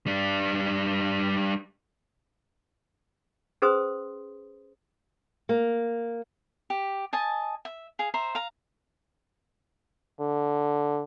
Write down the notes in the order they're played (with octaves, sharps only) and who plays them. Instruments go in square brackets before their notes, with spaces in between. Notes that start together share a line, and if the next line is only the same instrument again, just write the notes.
[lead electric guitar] G3 D4
[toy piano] C#4 G#4 B4 C5 C6 D#6
[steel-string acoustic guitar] A#3
[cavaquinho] G4
D#5 G#5 A5
E5
G#4 F5
C5 E5 A#5
F5 A#5
[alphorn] D3